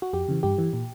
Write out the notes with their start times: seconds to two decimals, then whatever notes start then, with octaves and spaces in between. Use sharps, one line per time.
0.02 F#4
0.13 F2 G4
0.28 C#3 E3
0.43 G2 G4
0.58 E3
0.73 A#2